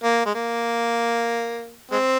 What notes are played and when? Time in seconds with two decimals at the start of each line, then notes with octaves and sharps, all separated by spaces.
0.03 A#3
0.26 G#3
0.35 A#3
1.91 G#3 C4